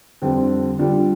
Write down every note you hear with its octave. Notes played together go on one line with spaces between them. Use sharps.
F2 D3 G3 C4
D3 G3 D4 F4